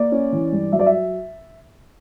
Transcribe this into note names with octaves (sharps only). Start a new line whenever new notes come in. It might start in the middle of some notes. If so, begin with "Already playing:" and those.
Already playing: A#3 D5
C#4
E3
G2
F#3 E5
D5
E5